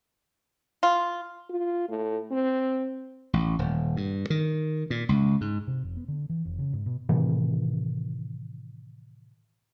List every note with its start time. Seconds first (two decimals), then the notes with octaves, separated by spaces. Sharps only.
0.83 F4
1.50 F4
1.89 A2
2.31 C4
3.33 A1
3.59 D#1
3.97 G2
4.30 D#3
4.90 A#2
5.09 C#2
5.41 G#2
5.67 C3
5.83 F1
5.97 B3
6.08 D3
6.29 E3
6.45 F1
6.59 C#3
6.73 G#2
6.86 B2
7.09 A2 C3 D#3 E3